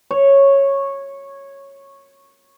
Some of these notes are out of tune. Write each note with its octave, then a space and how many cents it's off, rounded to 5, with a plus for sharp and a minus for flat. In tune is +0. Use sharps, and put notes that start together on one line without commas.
C#5 -10